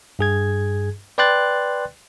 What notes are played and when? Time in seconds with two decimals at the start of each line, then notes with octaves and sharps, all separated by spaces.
0.19 G2 G#4 G#6
1.18 B4 D5 G5 C6 F#6 A6